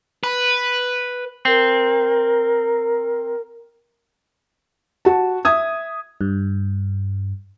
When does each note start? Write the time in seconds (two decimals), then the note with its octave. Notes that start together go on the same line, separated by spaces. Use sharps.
0.24 B4
1.45 C4 A#4
5.05 F#4 A5
5.45 E5 D#6 G#6
6.21 G2